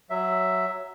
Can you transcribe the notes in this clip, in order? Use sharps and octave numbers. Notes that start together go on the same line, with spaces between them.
F#3 E5